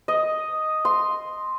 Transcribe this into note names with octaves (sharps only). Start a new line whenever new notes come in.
D#5
C6